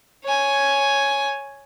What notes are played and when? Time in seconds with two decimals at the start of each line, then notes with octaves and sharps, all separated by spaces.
0.24 C#5 G#5